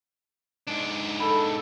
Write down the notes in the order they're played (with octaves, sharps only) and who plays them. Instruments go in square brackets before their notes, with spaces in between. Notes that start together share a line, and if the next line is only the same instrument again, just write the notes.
[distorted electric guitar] G#2 D4
[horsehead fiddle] A4 [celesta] B5